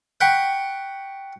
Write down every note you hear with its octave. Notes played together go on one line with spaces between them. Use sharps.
F#5 G5 B5 C#6